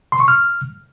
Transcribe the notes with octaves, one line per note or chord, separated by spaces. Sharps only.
C6
C#6
F6